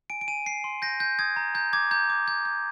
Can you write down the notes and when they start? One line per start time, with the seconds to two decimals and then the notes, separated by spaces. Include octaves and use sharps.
0.10 G#5 D7
0.21 D7
0.28 G#5 D#7
0.46 G#5 C7
0.64 C6
0.82 G6 A#6
1.00 G6
1.19 D#6 G#6
1.36 A#5
1.55 A#5 G6
1.73 D6 G#6
1.91 A#5 G6
2.10 D6
2.28 G6
2.45 G6